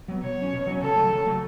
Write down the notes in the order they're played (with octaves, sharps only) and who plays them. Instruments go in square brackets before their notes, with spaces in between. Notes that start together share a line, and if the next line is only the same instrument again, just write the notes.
[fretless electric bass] F#3 B3
[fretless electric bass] B2 [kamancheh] C#5
[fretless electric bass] F#3 C#4
B2
F#3 C#4
[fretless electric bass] C#3 [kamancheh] A4
[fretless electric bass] F#3 A3
C#3
F#3 A3